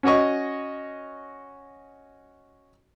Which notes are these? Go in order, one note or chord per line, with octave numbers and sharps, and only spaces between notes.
C#4 F#4 C#5 D#5 C#6